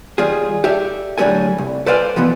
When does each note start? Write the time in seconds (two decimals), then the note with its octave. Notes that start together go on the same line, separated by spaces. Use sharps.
0.18 D#2 G3 F4 G#4
0.64 G4 A4 D5 E5
1.18 A2 D3 F#3 G3 A4 G#5
1.58 C2
1.86 A4 B4 C5 D5 F5 G#5
2.16 B2 E3 F3 B3